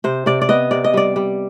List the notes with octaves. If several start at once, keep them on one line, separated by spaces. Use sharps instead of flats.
C3 C5
C3 D5
D5
B3 D#5
C3 D5
D#5
G3 D5
G3